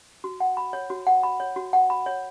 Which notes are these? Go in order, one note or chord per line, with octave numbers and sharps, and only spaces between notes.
F#4
F#5
B5
C#5
F#4
F#5
B5
C#5
F#4
F#5
B5
C#5